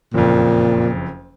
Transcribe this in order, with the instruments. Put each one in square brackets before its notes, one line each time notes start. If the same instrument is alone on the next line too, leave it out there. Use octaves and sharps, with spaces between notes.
[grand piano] F#1 F2 [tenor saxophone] A#2